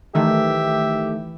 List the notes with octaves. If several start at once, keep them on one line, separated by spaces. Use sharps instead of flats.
D#3 E3 A3 G4 E5